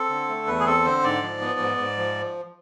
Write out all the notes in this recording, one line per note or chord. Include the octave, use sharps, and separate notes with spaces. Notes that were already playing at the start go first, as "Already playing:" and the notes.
Already playing: C4 A4
D3
A3
E2 B4
G#4
C4 A4
D3 C5
G#2 D5
F3
B3
G#2
G#2
F3